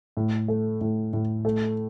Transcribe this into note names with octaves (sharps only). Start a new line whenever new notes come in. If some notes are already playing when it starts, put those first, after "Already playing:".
A2
A3
A2
A2
A3